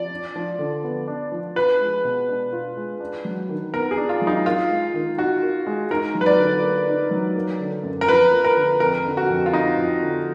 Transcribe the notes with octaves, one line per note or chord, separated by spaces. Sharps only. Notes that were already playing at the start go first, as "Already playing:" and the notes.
Already playing: F3 D5
D4
F3
D3
B3
D4
F3
F4 B4
G#3
B2
D4
F4
G#3
D4
F#3
D#3
B3 A#4
G#4
D4
F4
F#3
D#4
F4 A#4
G#3
D#3
D#4 F#4
A#4
G#3
D#4 A#4
F#3
B4
D5
D3
A#3
D#4
F#3
A#3
D3
F#2
A#4
F3 B4
A#3
A#4
D3
F2 A#4
D3
F#4
F2
F4
F3 D#4
F2
D3